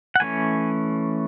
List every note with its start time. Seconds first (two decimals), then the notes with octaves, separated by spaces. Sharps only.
0.16 F#5
0.20 E3 A3 C#4 G#5